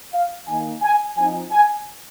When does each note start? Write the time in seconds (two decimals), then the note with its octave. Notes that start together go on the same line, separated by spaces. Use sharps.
0.13 F5
0.48 D#3 A#3 D#4 G#5
0.82 G#5
1.17 F3 C4 D#4 G#5
1.51 G#5